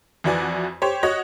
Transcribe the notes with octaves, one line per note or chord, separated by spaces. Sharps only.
F2 E3 F#4 D5 G#5
G4 C5 C#5
F#4 C#5 D#5